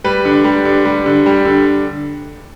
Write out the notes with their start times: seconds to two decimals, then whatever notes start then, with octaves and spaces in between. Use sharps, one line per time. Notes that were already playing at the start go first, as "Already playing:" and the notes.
0.04 G3 B4
0.25 D3
0.44 G3
0.65 D3
0.85 G3
1.06 D3
1.26 G3
1.45 D3